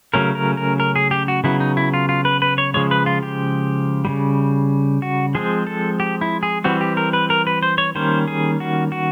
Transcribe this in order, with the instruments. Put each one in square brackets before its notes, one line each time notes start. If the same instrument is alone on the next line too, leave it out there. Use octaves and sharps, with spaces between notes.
[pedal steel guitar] C#3 F#3 A3 C#4 A#4
A#4
A#4
A#4
G#4
G4
F#4
C#3 F#3 B3 E4
D#4
E4
F4
F4
B4
B4
C#5
C#3 F3 G#3 C#5
B4
F4
G4
C#3 E3 G3
F#4
F3 G#3 C4 G#4
A4
G4
E4
G#4
E3 G3 C4 F#4
G4
A#4
B4
A#4
B4
C5
C#5
D#3 G3 A#3 C#4 C5
G#4
F#4
F#4